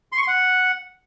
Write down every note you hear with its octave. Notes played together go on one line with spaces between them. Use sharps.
C6
C#6
C6
F#5